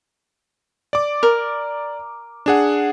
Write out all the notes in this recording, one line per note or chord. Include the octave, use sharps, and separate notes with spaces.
D5 D6
A#4
D4 G#4 F#5